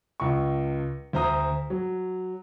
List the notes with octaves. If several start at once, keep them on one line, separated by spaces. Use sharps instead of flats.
C#2 C#6
D2 C5 A#5 D#6
F#3